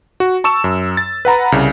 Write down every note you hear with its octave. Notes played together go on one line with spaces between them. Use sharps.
F#4
A5 C#6 E6 E7
F#2
A6
B4 F#5 A#5 B5
C2 C#3